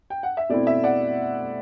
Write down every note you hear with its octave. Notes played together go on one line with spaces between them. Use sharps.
G5
F#5
E5
B2 A3 C4 E4 D5
E5
D5 F#5